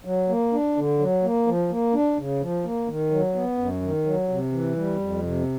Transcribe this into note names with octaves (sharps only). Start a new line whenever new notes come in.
F#3
A#3
D4
D3
F#3
A#3
F3
A#3
D4
C#3
F3
A#3
D#3
F#3
B3
F#2
D#3
F#3
C3
E3
G3
F2
C3